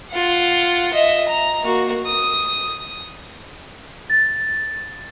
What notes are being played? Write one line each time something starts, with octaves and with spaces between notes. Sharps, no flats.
F4 F#5
D#5 E5
A#5
A#3 F#4
D#6
A6